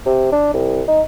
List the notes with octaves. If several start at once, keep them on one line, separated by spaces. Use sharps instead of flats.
C3
D4
C2
D#4